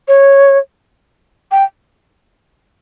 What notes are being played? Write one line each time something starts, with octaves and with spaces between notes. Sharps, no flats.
C#5
G5